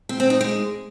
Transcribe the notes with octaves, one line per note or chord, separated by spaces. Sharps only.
C4
C4
D#4
G#3